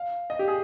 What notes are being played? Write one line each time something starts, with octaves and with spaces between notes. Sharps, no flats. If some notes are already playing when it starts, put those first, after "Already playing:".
Already playing: F5
D#5
G4
G#4